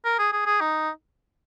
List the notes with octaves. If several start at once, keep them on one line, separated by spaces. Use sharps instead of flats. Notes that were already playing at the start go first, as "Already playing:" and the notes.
A#4
G#4
G#4
G#4
D#4